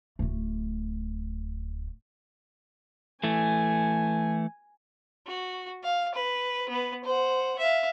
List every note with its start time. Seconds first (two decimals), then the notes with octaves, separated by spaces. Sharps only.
0.19 D1 A3
3.24 E3 A3 G#5
5.27 F#4
5.83 F5
6.14 B4
6.69 B3 B4
7.04 C5 F#5
7.58 E5 F5